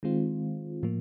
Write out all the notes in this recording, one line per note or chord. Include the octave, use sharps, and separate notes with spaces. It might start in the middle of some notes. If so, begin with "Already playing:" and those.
D#3 G#3 C4 F4
A2 F3 A#3